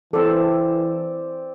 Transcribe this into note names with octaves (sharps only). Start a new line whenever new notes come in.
E3 C4 A4 D5